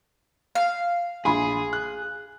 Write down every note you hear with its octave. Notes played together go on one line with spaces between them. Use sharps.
F5
A#1 G#4 B5 C6
F#6